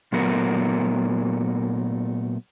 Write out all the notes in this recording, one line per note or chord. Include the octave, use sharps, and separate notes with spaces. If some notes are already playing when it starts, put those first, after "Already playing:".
A#2 F#3 A3 B3 A#4